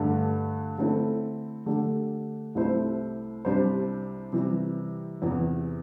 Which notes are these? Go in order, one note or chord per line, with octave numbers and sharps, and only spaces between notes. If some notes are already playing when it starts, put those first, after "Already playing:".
Already playing: G2 D3 A3
D3 A3 C4 E4 A4
D3 A3 D4 G4
C2 C3 A3 E4 C5
C2 C3 G3 D4 C5
C3 E3 G3
E2 C3 E3